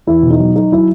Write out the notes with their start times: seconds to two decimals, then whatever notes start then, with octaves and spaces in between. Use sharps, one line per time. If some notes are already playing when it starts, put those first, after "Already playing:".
0.07 E2 E4
0.23 B2
0.31 D#4
0.39 F#3
0.56 F#3 D#4
0.72 F#3 E4